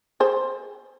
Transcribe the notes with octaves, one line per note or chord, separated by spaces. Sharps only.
G#4 C5